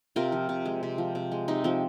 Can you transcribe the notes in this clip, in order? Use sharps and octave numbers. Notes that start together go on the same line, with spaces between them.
C3 F4 A#4
F3
C3
G#3
C3
F3
C3
G#3
C3 D#4
F3 C4